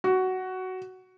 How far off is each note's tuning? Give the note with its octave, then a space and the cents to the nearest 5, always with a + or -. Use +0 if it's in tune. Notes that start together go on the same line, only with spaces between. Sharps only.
F#4 +10